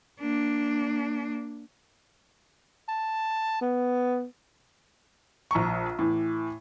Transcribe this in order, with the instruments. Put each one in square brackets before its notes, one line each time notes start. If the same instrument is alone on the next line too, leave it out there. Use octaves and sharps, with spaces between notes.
[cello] A#3 D4
[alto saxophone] A5
B3
[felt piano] A#1 A#5 C#6
A2 E3